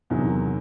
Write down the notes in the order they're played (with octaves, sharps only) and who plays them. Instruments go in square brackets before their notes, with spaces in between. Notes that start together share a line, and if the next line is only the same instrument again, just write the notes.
[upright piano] E2 C3 D#3 F#3